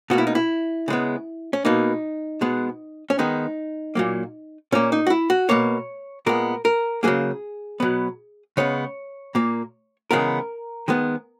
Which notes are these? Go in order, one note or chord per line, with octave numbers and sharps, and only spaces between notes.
B2 A#3 F#4
E4
D#4
E4
C#3 G#3 B3
C#4
B2 A#3 D#4
B2 G#3 B3
C#4
D#3 G#3 B3 D#4
A#2 F#3 A#3
A#2 A#3 C#4
D#4
F#4
E4
F#4
B2 A#3 C#5
A#2 G#3 B3 A#4
A#4
C#3 F#3 A#3 G#4
B2 F#3 B3
C#3 G#3 B3 C#5
A#2 A#3
C#3 E3 G#3 B3 A#4
D#3 G#3 B3